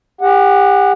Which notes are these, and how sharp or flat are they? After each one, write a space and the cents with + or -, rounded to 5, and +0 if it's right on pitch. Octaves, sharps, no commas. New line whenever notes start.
G4 +35 F#5 +0